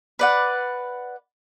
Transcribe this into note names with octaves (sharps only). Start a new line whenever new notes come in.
B4 D5 F#5